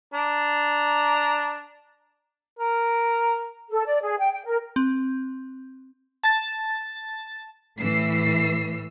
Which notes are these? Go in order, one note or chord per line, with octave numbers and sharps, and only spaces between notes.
D4 A#5
A#4
A4
D5
G#4
G5
G5
A#4
C4
A5 A6
A2 E3 E6 C7